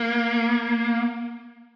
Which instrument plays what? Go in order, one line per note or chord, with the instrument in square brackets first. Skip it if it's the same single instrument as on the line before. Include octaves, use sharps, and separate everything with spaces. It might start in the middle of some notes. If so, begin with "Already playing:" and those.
Already playing: [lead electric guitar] A#3